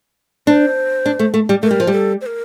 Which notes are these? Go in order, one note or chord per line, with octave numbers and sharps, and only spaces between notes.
D4 C5
D4
A3
A3
G3
A3 A#4
G3
F3
G3 A4
C5
A#4